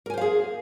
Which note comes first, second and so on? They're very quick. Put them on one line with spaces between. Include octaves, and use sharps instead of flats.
A#4 G#5 C5 F5 G#4